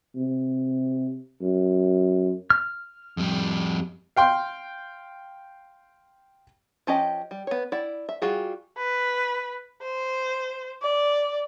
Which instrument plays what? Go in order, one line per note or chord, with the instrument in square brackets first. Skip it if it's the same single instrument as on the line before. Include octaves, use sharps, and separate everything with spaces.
[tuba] C3
F#2
[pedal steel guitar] F6
[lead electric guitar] F2 G3
[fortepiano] F5 G5 C6
[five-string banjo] F3 C#4 G4 D#5
G3
B3 C#5
E4 D5 F#5
E5
G3 F4 F#4 G#4
[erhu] B4
C5
D5